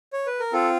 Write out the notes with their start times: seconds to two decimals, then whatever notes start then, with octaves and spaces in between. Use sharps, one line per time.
0.13 C#5
0.27 B4
0.40 A#4
0.53 C4 F4 A4